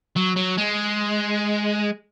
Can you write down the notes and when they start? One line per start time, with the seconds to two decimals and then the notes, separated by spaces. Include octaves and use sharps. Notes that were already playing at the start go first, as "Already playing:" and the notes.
0.16 F#3
0.36 F#3
0.57 G#3